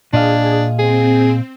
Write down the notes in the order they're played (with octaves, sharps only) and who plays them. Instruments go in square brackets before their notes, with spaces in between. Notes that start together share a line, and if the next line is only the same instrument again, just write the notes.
[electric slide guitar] A#2 D#5 F5 [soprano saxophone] D4 [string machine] G#4
[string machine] C4 [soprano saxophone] G#4